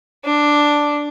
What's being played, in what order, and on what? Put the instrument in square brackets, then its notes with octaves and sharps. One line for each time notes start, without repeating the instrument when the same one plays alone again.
[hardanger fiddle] D4